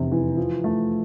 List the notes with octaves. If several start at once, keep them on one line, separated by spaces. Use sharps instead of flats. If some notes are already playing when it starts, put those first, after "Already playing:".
Already playing: F1 E2 C3
E3
F3
A3